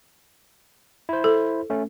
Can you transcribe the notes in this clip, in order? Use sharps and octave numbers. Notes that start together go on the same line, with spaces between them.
E4 C5
A4
A3 C#4